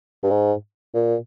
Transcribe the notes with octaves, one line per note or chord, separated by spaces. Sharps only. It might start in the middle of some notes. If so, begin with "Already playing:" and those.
G2
G#2
A#2